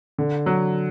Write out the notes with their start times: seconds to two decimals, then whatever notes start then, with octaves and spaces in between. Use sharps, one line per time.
0.18 D3
0.46 F#3